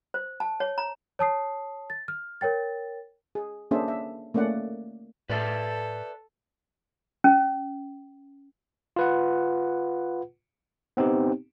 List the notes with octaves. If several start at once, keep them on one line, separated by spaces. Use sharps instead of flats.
C5
A5
C#5
A#5
C#5 A5 D#6 C7
A6
F6
A#4 C#5 G5 A6
G#4
A#3 C#4 D4 G#4 C5 E5
E5
A3 A#3 C#4 D5 F#5
A2 A4 B4 D5 E5
C#4
F4 B4 F#5
B3 C4 D#4 G4